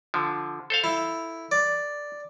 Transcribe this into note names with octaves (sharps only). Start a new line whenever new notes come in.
D3 F3
A4 C5 F5
E4
D5